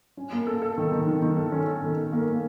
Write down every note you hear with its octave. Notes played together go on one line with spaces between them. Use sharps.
C#4
A#3
A4
A4
D#3
D#3
D#3
D#3
A4
C#4
A4
D#3
A4
A#3
A#3